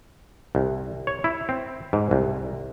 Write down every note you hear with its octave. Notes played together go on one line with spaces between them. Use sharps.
C2
C#5
E4
C4
G#2
C2